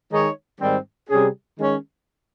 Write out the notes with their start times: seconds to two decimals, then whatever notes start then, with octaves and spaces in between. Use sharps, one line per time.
0.11 D#3 G#3 D#4 G#4 C#5
0.60 G#2 D#3 G3 C4
1.10 C3 G3 C#4 G#4
1.59 D#3 G#3 C#4